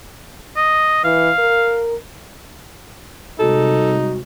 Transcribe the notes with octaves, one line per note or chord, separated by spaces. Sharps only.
D#5
E3 F5
A#4
C3 G3 G#3 D#4 F#4 A4